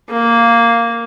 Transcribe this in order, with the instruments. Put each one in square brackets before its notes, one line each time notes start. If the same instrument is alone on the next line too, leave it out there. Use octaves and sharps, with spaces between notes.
[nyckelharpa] A#3